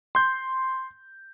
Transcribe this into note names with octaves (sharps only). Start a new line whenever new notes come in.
C6 G6